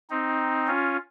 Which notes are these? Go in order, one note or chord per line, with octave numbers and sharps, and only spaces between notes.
C4 D#4
C#4 F4